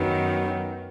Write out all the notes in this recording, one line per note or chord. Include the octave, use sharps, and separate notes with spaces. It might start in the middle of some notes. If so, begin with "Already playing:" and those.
Already playing: F#2 D#3 F#3 B3